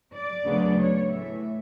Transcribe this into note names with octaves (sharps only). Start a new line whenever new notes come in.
D5
D2 C#3 F#3 B3 D4
C#5
A2 E3 A3 E5